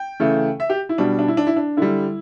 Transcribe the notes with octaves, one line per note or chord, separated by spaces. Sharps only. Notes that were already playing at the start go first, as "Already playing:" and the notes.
Already playing: G5
C#3 E3 A3
E5
G4
E4
B2 G3 D4
D4
E4
D4
E4
D4
D3 G3 E4